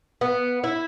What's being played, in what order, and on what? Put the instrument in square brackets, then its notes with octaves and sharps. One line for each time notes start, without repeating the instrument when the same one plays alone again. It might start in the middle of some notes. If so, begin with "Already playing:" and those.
[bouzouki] B3
E4